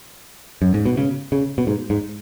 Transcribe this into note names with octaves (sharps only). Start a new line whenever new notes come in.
F#2
G#2
B2
C#3
C#3
B2
G#2
G#2